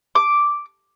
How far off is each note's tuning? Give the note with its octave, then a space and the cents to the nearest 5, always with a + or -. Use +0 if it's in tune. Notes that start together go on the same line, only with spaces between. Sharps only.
D6 -5